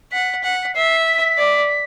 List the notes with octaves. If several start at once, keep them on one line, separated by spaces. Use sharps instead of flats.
F#5 B6
F#5
B6
E5 C7
B6
D5